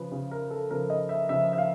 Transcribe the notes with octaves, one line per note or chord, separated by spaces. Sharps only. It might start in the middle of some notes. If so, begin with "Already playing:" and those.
Already playing: C#3 F3 B4
C#3 F3
A#4
A4
C#3 F3 A#4
D#5
E5
C#3 F3 E5
E5
F5